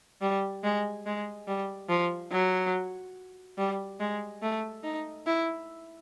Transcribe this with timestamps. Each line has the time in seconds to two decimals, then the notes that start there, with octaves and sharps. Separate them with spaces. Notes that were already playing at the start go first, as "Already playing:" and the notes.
0.21 G3
0.63 G#3
1.06 G#3
1.47 G3
1.89 F3
2.32 F#3
3.58 G3
4.00 G#3
4.42 A3
4.83 D#4
5.26 E4